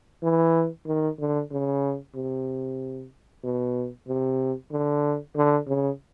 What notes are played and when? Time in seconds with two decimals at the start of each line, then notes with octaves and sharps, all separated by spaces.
0.23 E3
0.86 D#3
1.19 D3
1.51 C#3
2.15 C3
3.44 B2
4.08 C3
4.71 D3
5.36 D3
5.67 C#3